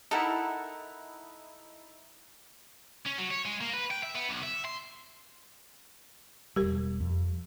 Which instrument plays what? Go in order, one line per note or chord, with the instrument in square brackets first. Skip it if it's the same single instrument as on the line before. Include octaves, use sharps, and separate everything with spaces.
[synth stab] D#4 E4 [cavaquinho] A4 A#4 F#5
[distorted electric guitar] C#4
F#3
C#5
G#3
A#3
B4
G5
E5
B3
B1
E5
C6
[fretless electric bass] E1 G3 [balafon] G4 A#4
[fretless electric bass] F2